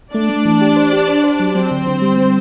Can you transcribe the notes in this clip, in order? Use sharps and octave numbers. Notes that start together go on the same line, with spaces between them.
A3 D4 D5
A3
E3
G4
C5
G4
C5
C5
F#3
F#3 C4 C5
D3
D3
G3
G3